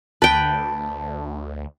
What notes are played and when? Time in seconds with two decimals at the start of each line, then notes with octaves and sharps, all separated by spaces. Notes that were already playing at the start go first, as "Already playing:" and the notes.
0.22 D2 B4 G5 A5